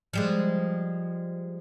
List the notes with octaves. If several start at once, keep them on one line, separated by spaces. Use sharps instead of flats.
F3 G3 G#3